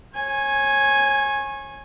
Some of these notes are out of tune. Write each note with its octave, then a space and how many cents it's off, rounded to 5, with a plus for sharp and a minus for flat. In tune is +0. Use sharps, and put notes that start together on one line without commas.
C#5 -30 G#5 +0